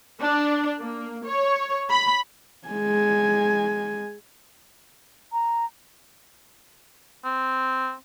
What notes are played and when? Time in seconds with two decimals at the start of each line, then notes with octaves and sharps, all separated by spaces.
0.21 D4
0.80 A#3
1.26 C#5
1.90 B5
2.68 G#3 G#5
5.33 A#5
7.24 C4